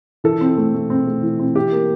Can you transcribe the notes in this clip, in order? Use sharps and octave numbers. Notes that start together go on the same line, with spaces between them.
E3 A4
C4
A3
A3
C4
A3
E3
C4
E3 G4
A#3